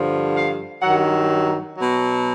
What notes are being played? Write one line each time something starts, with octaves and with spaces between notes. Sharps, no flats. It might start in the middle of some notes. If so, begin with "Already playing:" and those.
Already playing: G2 D3 F3
F5
G2 D#3 F#3 F#5
B2 F#3